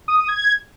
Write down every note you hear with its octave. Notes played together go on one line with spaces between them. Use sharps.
D#6
D#6
G#6